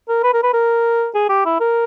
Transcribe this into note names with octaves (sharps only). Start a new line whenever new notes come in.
A#4
B4
A#4
B4
A#4
G#4
G4
E4
A#4